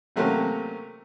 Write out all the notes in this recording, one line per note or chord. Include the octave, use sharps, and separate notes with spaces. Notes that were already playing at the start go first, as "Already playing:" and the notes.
C3 F#3 A3 A#3 C4 C#4